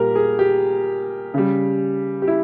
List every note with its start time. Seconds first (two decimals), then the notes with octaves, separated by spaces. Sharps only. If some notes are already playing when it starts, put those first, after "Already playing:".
Already playing: A#2 G3 G4 A#4
0.16 G#4
0.39 G4
1.34 C#3 G3
2.22 G4
2.27 E4